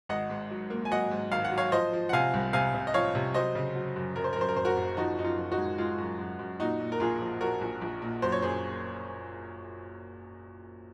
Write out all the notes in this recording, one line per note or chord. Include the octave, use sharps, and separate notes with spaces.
G#1 D#5 F#5
G#2
F#3
A#3
G#5
F#3 D#5 F#5
G#2
G#1 F5
F#5
F#3
C#5 F5
F3 C5 D#5
F3
F#5
C3 F5 G#5
C2
C3 F5 G#5
C3
D#5
F3 C#5 F5
C3
F#3 C5 D#5
C#3
F#3
F#2
F#2 A#4
C5
A#4
F#2 C5
A#4
F#1 C5
F#4 A#4
F#1
F3 D#4 F#4
F#2 D#4
F4
F3
D#4 F#4
G#3
G#3 F4
F#2
F#2
F#2
A#2 D#4 F#4
A#2
A#4
A#1 F4 G#4
F3
F3 F#4 A#4
A#1
A#1
A#2
F#2 C5
C#5
F#1 G#4 C5